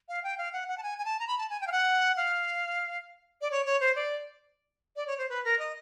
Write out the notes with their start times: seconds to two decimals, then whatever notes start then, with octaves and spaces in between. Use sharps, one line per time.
0.09 F5
0.24 G5
0.38 F5
0.53 F#5
0.68 F#5
0.78 A5
0.83 G#5
0.98 G#5
1.05 A5
1.20 A#5
1.27 B5
1.39 A5
1.50 G#5
1.61 G5
1.67 F5
1.72 F#5
2.17 F5
3.41 D5
3.51 C#5
3.66 C#5
3.80 C5
3.96 D5
4.96 D5
5.07 C#5
5.18 C5
5.29 B4
5.44 A#4
5.59 D#5